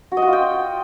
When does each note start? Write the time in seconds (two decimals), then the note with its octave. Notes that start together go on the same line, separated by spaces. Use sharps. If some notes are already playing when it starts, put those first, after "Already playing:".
0.12 F#4
0.17 D#5
0.22 F#4
0.27 F4
0.33 G5